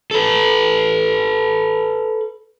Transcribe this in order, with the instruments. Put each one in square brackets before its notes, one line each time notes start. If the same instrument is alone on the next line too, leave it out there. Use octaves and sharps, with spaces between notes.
[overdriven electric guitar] A4 B4